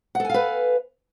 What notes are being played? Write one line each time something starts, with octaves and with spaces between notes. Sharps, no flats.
A4 B4 F5 F#5 G#5